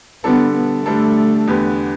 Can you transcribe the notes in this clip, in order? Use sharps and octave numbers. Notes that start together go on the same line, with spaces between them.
D3 G3 B3 D4 A4
B3
D3 G3 A3 D4 A4
E2 D3 B3 G4